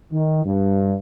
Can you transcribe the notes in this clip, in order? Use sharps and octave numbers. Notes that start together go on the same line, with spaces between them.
D#3
G2